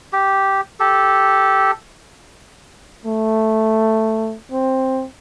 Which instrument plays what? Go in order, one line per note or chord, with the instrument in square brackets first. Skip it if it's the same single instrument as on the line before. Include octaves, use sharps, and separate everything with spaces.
[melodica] G4
G4 A4
[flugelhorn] A3
C4